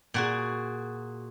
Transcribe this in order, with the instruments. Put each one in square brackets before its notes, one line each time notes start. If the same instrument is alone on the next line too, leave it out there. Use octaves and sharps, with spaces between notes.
[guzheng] A#2 F#4 G#4